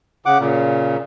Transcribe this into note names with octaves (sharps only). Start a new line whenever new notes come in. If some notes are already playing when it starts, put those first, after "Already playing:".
C#3 F#5 D6
A#2 C#3